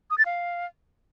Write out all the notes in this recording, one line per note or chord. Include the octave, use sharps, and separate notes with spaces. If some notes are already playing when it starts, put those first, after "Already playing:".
D#6
A6
F5